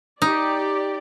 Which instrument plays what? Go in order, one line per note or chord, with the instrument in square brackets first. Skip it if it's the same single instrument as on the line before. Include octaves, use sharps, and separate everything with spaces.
[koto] D#4 [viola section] G4 D5